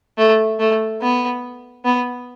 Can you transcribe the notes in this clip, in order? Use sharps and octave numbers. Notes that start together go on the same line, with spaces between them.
A3
A3
B3
B3